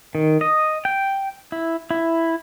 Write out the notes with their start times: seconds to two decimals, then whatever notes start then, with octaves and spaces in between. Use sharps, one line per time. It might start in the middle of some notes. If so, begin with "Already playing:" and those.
0.15 D#3
0.41 D#5
0.85 G5
1.52 E4
1.91 E4